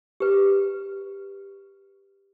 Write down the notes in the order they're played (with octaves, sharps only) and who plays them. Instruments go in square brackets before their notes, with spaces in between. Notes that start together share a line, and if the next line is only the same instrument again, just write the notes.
[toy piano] G4 B4